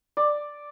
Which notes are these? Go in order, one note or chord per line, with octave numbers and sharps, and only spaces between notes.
D5